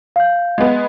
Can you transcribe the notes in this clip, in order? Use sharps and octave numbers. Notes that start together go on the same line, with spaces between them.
F5 G6
G#3 B3